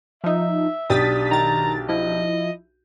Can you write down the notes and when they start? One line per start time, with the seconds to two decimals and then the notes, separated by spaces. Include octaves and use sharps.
0.24 F3 D#4 E5
0.90 B1 D4 G4 D#6 A6 B6
1.31 D#3 A#5 A6
1.89 F3 E4 D#5